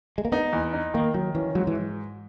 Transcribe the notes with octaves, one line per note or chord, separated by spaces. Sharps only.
G#3
A#3
B3 D#4
E2
D#4
D#3 A#3
D#3 F#3
E3 C#4
G#2 F#3
E3